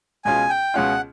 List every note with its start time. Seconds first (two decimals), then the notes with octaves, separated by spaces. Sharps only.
0.25 C#2 B2 G#3 C#4 F4 G#5
0.49 G5
0.74 C#2 B2 G#3 C#4 F4 F#5